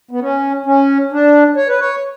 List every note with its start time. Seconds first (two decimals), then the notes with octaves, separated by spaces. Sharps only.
0.11 B3
0.21 C#4
0.66 C#4
1.12 D4
1.56 C#5
1.68 B4
1.80 C#5